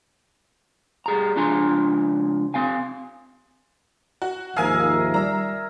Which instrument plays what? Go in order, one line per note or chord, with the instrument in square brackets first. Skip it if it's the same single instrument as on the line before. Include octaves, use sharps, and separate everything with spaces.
[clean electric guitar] G3 G#4 A#5
C#2 F3 D4 G#5 A#5 C6
C4 F5 G#5
[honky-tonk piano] F#4
[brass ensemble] D#2 G#2 F3 [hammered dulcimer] G#4 A#4 E5 [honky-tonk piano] F5 G#5
[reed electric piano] G3 D5 [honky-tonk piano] A#5 E6